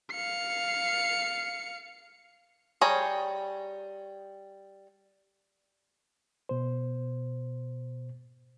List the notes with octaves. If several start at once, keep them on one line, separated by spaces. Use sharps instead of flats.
F5 C#7
G3 G#4 C#5 A#5
B2 C5